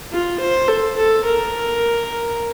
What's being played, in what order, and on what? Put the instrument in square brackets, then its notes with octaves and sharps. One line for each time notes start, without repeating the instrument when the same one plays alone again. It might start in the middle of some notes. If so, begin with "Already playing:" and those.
[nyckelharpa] F4
C5
A4
A4
A#4